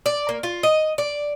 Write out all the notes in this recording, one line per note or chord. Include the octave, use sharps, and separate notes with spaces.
D5
A#3
F4
D#5
D5